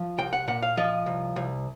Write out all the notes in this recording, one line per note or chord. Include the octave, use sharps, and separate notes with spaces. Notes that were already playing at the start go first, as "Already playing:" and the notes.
Already playing: F3
C2 G5
F#5
A#2 F#5
F5
F3 D#5
C2
C2